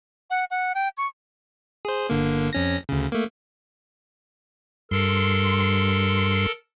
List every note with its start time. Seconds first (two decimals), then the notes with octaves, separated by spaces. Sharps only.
0.30 F#5
0.51 F#5
0.75 G5
0.97 C#6
1.85 G#4 C5
2.10 G1 D3 A#3
2.53 F2 C#4 A#6
2.89 D2 C#3
3.12 A3 A#3
4.91 G2 A4 A#4 C6